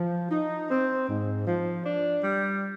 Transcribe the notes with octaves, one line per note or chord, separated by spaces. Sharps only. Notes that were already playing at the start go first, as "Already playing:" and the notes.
Already playing: F3
D#4
C4
G#2
F3
D4
G3